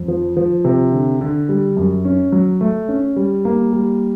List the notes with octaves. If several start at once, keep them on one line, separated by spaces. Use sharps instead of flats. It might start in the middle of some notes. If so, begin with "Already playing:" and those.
Already playing: F2
F3
F3
C3
D3
D3
G3
F#2
C#4
F#3
A3
C#4
G3
A#3
G3